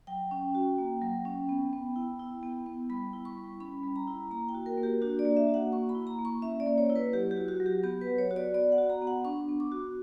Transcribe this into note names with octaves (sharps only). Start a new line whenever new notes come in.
F#3 G5
C#4
F#4
A#3
F#3
C#4
B3
B3
E4
E4
B3
B3
G3 B5
E4
C#6
G3
C#4 B5
G3
A#5
E4
A#3 A#5
G5
F#4
A#4
A#3
G4
D4 F#4
D5
A#3
E5
F#4
F#5
A#3 C#6
B5
E4
A#5
A#3
C#6
C#4 E5
D5
A#3
C#5
E4
B4
F#3 G4
G4
F#4
F#4
F#3
G4
B3 G4
B4
F#3
C#5
F#4
D5
B3 D5
F#5
F#4
A#5
B3
F#5
D4 C#6
B3
D6
F#4